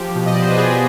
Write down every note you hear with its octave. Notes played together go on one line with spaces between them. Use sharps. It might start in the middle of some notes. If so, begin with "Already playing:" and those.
Already playing: F3 G4
B2
D#5
D5
B2
C5
B4
B3 G#4